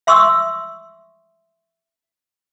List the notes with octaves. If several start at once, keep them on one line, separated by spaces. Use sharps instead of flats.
E5 C6 C#6 D#6 E6